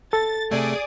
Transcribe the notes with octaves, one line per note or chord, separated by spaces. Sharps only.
A4 A6
C3 A3 G#4 D5 D#6